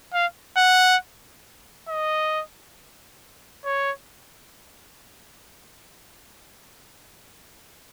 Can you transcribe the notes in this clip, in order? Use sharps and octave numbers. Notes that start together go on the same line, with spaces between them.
F5
F#5
D#5
C#5